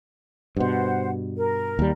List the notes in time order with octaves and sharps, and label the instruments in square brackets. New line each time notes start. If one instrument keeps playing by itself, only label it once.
[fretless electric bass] G2 B2 [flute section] C5 F#5
[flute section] A#4
[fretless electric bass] D#2 G3